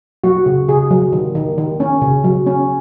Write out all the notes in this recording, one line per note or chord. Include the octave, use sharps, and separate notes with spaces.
F#3 F#4
C#3
C#3 G#4
F#3
D#3
D#3
D#3
C#4
C#3
F#3
C#4